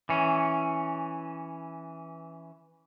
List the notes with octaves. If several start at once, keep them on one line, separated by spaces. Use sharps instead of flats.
E3 C#4